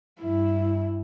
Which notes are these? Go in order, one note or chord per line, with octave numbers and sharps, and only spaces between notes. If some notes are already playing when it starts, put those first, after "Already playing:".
G2 E4